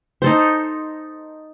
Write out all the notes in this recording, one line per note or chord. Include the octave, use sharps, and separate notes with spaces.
D#4 A4 C5